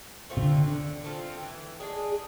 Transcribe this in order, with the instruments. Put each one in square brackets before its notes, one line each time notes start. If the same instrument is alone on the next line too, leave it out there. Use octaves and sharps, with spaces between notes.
[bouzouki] A3 C4 F4
[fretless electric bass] C3
D3
[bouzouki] D3
A3 C4 F4
E3
G#3 D4 G#4